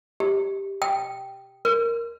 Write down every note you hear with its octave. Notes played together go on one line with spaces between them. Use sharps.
G4
G5
A#4